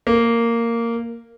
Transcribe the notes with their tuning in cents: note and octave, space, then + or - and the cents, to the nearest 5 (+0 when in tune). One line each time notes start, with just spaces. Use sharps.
A#3 -10